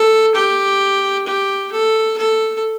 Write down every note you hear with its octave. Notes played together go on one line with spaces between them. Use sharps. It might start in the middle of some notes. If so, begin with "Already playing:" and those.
Already playing: A4
G4
G4
A4
A4